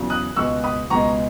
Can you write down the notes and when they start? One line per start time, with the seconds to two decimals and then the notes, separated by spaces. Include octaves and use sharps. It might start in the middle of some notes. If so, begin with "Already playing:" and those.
Already playing: E2 C#3 F#3
0.10 D#6 F#6
0.36 C#2 B2 G#3 C#6 E6
0.64 B5 D#6
0.90 C#2 B2 G#3 A#5 C#6